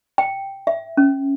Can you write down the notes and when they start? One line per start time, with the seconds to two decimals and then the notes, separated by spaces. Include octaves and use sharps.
0.18 G5
0.67 E5
0.97 C#4